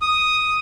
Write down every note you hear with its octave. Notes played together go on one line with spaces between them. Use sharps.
D#6